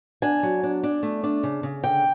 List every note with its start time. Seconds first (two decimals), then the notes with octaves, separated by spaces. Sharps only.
0.22 D4 G#5
0.43 F#3
0.63 D4
0.83 D4
1.03 A3
1.24 D4
1.43 C#3
1.63 C#3
1.84 D3 G5